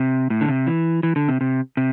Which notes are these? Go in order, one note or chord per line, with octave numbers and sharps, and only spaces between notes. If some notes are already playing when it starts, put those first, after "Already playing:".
Already playing: C3
A2
D3
C3
E3
E3
D3
C3
C3
C3